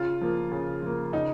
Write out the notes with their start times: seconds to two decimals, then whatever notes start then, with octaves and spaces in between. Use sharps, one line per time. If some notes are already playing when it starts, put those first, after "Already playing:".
Already playing: C#3 F4
0.21 F3 A#3
0.52 C#3
0.82 F3 A#3
1.12 C#3 D#4